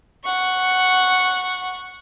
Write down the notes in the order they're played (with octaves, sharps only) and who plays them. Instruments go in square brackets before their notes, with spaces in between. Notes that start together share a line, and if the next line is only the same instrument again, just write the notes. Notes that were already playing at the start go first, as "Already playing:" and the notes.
[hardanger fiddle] F#5 C#6